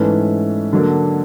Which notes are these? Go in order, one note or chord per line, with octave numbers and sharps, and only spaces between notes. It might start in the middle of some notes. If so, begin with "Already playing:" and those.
Already playing: G#2 E3 A3 C#4 B4
D3 F#3 A#3 D4